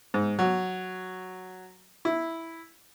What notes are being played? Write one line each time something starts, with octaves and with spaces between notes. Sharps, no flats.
G#2
F#3
E4